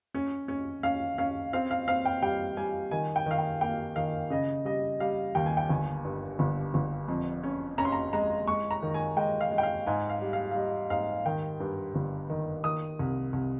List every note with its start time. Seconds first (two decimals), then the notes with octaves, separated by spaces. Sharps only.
0.15 C#4
0.48 C#4
0.83 C#4 F5
1.18 C#4 F5
1.53 C4 F5
1.71 F5
1.88 C4 F5
2.05 G5
2.22 G3 G5
2.57 G3 G#5
2.91 D#3 G#5
3.16 G5
3.26 D#3 F5
3.38 G5
3.61 A#3 G5
3.96 D#3 F5
4.30 C#3 D#5
4.65 G3 D#5
5.00 G3 F5
5.35 D#2 G5
5.46 G#5
5.57 G5
5.69 G1 G#5
6.05 G2
6.39 G1
6.74 G1
7.08 F2
7.43 C#4
7.78 C#4 A#5
7.85 C6
7.92 A#5
8.13 G#3 A#5
8.48 G#3 C#6
8.71 A#5
8.82 D#3
8.94 G#5
9.17 G#3 G5
9.41 F5
9.51 G#3
9.58 G5
9.63 F5
9.87 G#2 G#5
10.10 F5
10.21 G3
10.33 F5
10.51 F5
10.56 G3 D#5
10.90 G#2 F5
11.25 D#3 G5
11.60 G2
11.95 G1
12.30 D#3
12.64 D#3 D#6
12.99 C2
13.33 C2